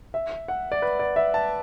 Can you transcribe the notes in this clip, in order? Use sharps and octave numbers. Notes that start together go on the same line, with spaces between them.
E5
F#5
D5
B4
D5
E5
A5